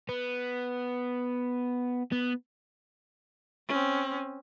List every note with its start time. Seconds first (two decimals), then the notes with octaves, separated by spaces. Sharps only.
0.09 B3
2.12 B3
3.68 C4 C#4